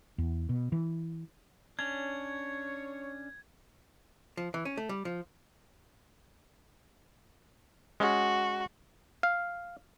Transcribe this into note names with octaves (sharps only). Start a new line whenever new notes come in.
E2
B2
E3
C#4 D4 C#5 G#6
F3
E3
C#4
A3
G3
F3
G#3 C#4 F#4
F5